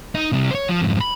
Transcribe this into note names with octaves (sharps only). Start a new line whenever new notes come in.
D#4
C3 G3
C5 C#5
F3
F2 G#2
B5